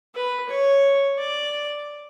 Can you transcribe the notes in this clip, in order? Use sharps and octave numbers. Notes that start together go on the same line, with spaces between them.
B4
C#5
D5